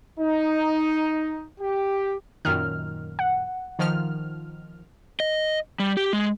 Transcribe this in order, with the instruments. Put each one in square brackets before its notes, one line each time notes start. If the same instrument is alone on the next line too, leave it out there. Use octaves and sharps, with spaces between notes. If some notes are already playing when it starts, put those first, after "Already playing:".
[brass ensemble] D#4
G4
[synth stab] F#2 A#2 D#3 [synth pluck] F6
[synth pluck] F#5
[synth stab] D#3 F3 F6
[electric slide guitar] D#5
G3
G4
G#3